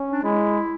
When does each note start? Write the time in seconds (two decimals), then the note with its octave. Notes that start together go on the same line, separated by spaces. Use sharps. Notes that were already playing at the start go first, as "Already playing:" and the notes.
Already playing: C#4
0.12 D4
0.23 G#3 E4